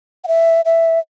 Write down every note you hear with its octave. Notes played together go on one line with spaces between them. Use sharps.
F#5
E5
E5